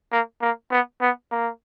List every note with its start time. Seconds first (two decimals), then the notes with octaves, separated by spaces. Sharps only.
0.12 A#3
0.41 A#3
0.71 B3
1.01 B3
1.31 A#3